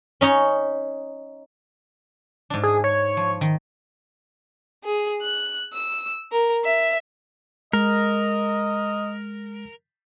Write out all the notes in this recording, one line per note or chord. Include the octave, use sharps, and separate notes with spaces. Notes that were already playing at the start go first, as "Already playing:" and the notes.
C#4 D#4 C#5
G#2 D4
G#4
C#5
F3
D#3
G#4
F#6
E6
A#4
E5
G#3 A#4 D#5